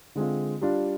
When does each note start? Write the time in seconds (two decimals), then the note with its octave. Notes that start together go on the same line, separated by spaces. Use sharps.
0.15 D3 G#3 C4 F4
0.61 G3 D4 F4